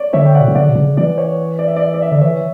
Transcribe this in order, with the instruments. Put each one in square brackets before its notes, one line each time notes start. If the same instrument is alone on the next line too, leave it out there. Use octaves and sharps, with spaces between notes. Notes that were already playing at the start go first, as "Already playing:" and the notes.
Already playing: [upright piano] C#5 D5
[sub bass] D3 [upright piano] C#5 E5
[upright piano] G5
D5 F#5
[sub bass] B2
C#3
[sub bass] D3 [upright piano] D5 F#5
[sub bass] B2
C#3
[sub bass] E3 [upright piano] D5
[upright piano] C#5
D5
E5
D5
E5
D5
E5
[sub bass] D3 [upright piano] D5
[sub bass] E3 [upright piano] C#5 E5